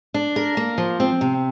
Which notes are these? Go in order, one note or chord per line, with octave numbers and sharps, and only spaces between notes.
D4
A#4
A#3
F3
C4
C3